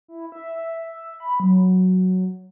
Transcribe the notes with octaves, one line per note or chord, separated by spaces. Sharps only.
E4
E5
B5
F#3